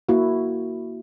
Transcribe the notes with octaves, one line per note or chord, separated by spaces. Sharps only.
A#3 E4 F#4